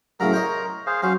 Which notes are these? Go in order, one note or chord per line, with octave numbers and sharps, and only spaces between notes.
A2 C#3 F#3 A#4 A#5
C5 C#5 D#5
G#4 C5 F5
F#3 C#4 C5 F5